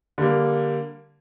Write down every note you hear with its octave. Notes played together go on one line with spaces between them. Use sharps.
D3 G3 A#3